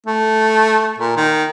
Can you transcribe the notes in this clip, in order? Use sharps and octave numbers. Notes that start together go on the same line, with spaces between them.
A3
A#2
D#3